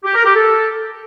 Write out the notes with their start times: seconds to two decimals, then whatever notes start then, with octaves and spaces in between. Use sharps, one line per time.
0.04 G4
0.14 A#4
0.24 G4
0.34 A4